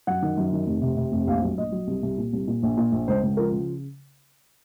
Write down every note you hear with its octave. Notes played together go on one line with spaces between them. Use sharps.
F#2 F#5
D#3
F#2
D#3
F1
C3
C3
F1
A#1 F5
F#3
A#1 D#5
F#3
C2
C2
A#2
C2
A#2
A#1
A#2
A#1
C#2 C5
C#2
F3 A#4
C#3